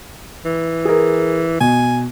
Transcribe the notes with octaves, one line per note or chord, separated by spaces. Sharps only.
E3
G#4 A#4
B2 G#5